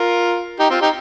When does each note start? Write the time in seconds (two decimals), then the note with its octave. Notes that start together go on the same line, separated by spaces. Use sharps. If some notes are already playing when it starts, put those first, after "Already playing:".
Already playing: F4 A#4
0.59 D#4 G4
0.70 C4 F4
0.81 D#4 G4